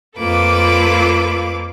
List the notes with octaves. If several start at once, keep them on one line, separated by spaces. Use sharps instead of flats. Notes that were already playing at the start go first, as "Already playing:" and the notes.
F2 A#3 F4 A4 B4 D6